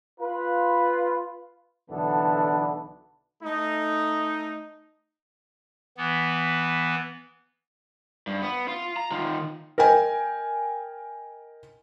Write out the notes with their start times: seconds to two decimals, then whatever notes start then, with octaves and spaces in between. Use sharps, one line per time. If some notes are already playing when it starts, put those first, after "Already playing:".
0.21 F4 B4
1.91 B1 D3 E3 B3 D4 A4
3.43 A3 D#4
5.97 E3 B3
8.27 G2
8.42 B3
8.68 F4
8.97 A#5
9.11 D#3 F4
9.78 A#4 D#5 G5 G#5